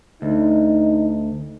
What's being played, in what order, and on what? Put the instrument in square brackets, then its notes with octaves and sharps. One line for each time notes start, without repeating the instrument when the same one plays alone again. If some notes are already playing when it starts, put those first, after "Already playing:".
[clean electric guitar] D2 [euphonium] D#4